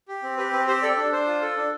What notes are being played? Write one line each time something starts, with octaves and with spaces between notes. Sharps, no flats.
G4
C4
G4 B4
C4 B4
G4 C5
A4 D5
D4
D4 C5
F4
A4
D4